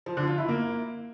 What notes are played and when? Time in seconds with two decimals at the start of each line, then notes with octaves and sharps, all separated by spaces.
0.06 F3
0.17 D3
0.27 F4
0.38 E4
0.48 A#3